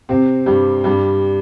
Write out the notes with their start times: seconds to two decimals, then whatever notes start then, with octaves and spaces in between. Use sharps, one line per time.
0.09 C3 C4
0.46 G2 G3
0.84 G2 G3